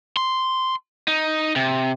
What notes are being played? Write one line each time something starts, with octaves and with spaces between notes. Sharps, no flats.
C6
D#4
C3